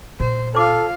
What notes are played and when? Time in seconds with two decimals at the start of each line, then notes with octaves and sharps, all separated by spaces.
0.20 A#2 C5
0.55 F4 A4 C5 F5 D6